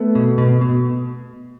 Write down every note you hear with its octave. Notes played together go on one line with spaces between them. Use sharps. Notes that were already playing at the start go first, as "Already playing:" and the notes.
Already playing: A3 B3
B2
B2
B2